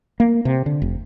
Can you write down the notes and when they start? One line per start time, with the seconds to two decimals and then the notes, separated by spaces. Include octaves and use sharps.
0.20 A#3
0.45 C3
0.66 D3
0.82 F1